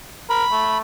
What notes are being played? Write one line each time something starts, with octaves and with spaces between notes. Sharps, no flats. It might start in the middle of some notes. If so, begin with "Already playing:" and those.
A#4 B5
A3